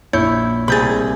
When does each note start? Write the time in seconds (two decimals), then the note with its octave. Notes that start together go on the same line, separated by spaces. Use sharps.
0.13 A#1 E4 C#5 G6
0.68 C2 G#4 B5 G6 A6